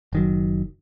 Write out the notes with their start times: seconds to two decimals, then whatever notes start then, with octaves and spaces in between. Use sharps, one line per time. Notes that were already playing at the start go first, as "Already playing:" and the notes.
0.13 F#1 D#3 F#3